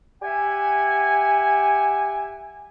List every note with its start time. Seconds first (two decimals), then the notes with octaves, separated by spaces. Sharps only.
0.22 G4 E5 F#5 G#5